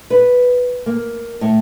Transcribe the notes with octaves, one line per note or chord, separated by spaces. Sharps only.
B4
A#3
A2